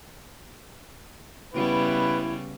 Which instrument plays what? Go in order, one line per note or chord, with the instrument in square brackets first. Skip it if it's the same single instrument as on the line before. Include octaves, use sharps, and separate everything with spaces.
[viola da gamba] C#3 G3 B3 [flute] E4 [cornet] B4